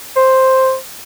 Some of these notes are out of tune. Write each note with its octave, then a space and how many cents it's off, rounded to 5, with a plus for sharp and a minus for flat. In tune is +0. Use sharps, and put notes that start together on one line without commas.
C5 +5